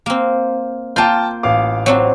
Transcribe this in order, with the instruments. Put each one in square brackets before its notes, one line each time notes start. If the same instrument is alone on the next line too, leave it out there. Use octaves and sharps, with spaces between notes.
[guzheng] A#3 C4
[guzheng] A#3 F4 [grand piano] G5 A5 G6
[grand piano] A1 F5 D6
[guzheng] F#3 C4 D4